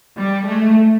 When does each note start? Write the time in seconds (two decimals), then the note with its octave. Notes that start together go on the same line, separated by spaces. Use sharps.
0.17 G3
0.46 A3